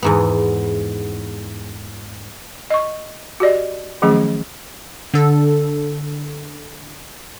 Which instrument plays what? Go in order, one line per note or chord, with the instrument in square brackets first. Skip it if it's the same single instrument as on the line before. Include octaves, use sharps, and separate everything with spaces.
[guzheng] E2 G#2 B3
[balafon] D#5 C#6
F#4 G4 D5 D#5
D#3 F3 F#3 A3 C#4 G#4
[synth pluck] D3 A4